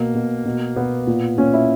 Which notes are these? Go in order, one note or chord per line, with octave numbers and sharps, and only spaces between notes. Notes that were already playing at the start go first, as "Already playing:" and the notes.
Already playing: B2 A#3
B2
B2
B2 B3
A#2
A#2 C#4
E4